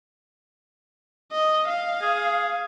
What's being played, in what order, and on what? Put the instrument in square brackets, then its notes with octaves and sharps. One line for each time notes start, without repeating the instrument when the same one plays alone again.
[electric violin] D#5
F5
[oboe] G#4